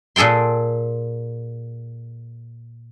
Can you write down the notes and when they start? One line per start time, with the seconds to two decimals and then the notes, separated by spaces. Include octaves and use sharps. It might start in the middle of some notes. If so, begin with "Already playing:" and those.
0.16 A#2 G#4 A4 G5 C6